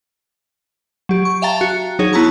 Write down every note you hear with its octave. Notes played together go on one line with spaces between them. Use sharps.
F#3 G4
C#6
E5 F5 G5 A5 A#5 A6
F#4
F#3 D#4 G#4 C#5
B3 E4 A5 A#5 C#6